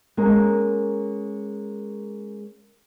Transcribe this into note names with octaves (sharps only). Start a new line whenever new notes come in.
G#3 A#3 B3 C#4 A#4